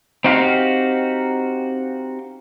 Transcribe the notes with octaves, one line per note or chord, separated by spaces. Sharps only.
C4 D#4 F#4 G4 F5